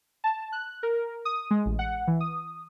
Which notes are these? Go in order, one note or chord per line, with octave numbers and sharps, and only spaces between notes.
A5
F#6
A#4
D#6
G#3
A1
F#5
E3
D#6